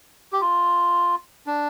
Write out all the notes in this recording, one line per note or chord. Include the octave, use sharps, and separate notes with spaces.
G4
F4
D4